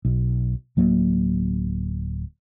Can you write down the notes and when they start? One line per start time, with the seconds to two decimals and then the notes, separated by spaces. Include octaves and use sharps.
0.05 B1
0.77 D1 F#3 A#3